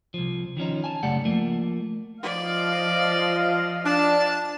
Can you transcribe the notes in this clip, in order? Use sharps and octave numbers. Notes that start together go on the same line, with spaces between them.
C2 F3
D#3 F3 C#4 D#4
G#5 A5
F#2 C#3 A3 G4 D5 F#5
F3 A3 A#3
F3 D5 D#5 F5
D4 A5